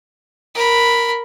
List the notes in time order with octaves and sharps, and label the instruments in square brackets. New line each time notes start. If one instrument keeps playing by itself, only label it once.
[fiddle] A#4 B5